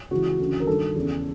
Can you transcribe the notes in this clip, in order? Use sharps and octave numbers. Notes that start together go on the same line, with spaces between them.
C#2 C#3 E3 F#4
D2 C#3 E3
A#4
G2 D#3 A4
E2 C#3 E3